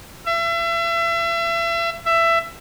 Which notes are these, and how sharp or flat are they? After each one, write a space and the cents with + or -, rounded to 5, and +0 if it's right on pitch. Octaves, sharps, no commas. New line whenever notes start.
E5 +35
E5 +20